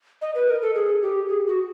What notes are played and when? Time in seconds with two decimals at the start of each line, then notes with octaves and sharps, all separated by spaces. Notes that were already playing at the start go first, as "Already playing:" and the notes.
0.22 D#5
0.35 B4
0.47 A#4
0.62 A4
0.75 G#4
1.02 G4
1.29 G#4
1.47 F#4